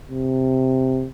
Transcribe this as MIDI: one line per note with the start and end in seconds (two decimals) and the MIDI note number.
0.11 1.07 48